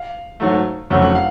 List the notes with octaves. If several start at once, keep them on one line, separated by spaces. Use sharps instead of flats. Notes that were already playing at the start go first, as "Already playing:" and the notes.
Already playing: F5
G#2 F#3 A3
F1 F2 C#3 F#3 A3 F#5
F#5
F5